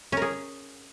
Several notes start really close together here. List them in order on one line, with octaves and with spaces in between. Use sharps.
C#4 A#4 G#4